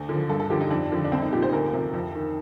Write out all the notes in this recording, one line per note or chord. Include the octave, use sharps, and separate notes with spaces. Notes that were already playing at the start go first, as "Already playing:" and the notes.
Already playing: D2
D3 F3
G2 A4
A4
D3 F3 G4
D#4
F2 D4
D3 F3
D4
C2 C4
D#4
A#2 F3 G4
C5
D2 A#4
C3 F3
F2
D#3